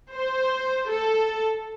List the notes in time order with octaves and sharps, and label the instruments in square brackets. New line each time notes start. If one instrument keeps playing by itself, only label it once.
[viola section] C5
A4